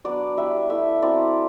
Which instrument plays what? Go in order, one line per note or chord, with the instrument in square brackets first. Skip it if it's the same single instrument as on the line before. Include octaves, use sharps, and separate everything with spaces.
[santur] F#3 B3 D4 D5
G3 B3 E4 E5
A3 E4 E5
F#3 C4 E4 D5